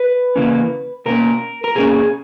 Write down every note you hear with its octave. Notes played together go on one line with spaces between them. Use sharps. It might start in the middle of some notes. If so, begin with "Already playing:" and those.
Already playing: B4
C#3 E3 A#3 C#4
B2 A#3 C#4 A#4
A#4
B2 A#3 C#4 G#4